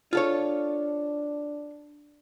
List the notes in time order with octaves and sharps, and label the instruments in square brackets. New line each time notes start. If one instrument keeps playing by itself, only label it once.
[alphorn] D4 [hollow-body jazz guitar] F4 A4 C#5